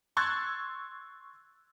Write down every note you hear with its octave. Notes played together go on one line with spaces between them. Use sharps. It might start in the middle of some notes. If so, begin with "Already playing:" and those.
C6 C#6 E6 F#6 G#6 A6